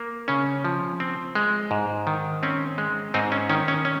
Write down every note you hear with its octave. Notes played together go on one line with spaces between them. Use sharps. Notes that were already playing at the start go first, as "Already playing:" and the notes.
Already playing: A#3
C#3 C#4
F3
C4
G#3
G#2
D#3
C4 C#4
G#3
G#2 C4 D#4
C#4
D#3 C#4
C#4
C#4